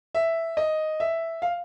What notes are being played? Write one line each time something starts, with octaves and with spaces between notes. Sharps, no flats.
E5
D#5
E5
F5